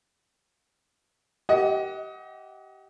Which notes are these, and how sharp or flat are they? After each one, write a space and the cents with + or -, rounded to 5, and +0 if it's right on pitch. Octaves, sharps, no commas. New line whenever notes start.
G4 -20 D#5 +30 F#5 +0